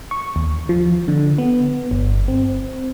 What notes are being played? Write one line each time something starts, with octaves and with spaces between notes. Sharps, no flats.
C#6
D#2
F3
D3
B3
G1
C4